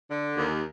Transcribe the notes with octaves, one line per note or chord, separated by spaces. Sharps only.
D3
D#2